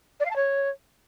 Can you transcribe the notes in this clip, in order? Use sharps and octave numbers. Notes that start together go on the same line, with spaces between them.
D5
F5
A5
C#5